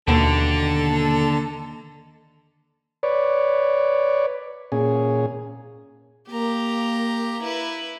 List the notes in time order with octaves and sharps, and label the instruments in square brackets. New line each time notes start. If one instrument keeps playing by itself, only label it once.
[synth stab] D#2 B2 [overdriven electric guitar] D3 [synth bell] D#3 A#3 [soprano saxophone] A4
[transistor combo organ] B4 C#5 D5
A#2 C#4 G#4
[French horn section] A#3 [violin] G4 A#5
[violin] E4 B4